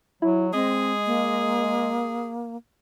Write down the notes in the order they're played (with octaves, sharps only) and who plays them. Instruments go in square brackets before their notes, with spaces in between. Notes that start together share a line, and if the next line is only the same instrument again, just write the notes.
[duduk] F#3 [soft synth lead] E4
[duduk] G#3 [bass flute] C4 [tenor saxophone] G#4 [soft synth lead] D#5
[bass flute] A#3